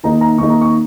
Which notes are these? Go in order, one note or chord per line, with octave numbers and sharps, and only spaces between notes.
D#3 A#3 D#4 A#5
A#5
D#3 A#3 D#4 C#6
A#5
C#6